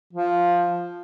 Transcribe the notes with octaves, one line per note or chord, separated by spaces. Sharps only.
F3